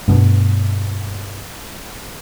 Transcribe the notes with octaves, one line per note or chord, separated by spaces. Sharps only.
G2 B2